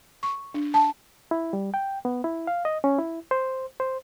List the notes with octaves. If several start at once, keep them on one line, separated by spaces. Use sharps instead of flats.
C#6
D4
A5
E4
G3
G5
B3
E4
F5
D#5
C#4
E4
C5
C5